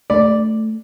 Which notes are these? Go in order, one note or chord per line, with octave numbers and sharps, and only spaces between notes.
A3 D5